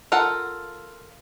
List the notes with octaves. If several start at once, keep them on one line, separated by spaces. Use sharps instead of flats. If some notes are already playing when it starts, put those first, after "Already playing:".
F4 A4 A#4 F#5